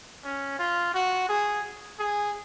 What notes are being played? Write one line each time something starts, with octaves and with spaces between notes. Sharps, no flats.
C#4
F4
F#4
G#4
G#4